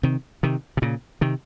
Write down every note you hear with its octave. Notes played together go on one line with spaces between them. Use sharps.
C3 D#3
C3 D#3
C3
A#2 C#3
C3 D#3